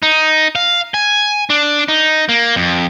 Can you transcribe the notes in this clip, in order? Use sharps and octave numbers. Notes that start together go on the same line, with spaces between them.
D#4
F5
G#5
D4
D#4
A#3
F2